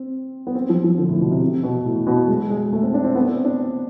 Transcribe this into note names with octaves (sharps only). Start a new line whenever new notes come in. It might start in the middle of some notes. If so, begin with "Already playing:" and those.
Already playing: C4
B3
C4
F3
F3
D3
A2
B2
C3
C3
B2
A2
B2
G#3
G#3
A3
C4
D4
C4
B3
C4
D4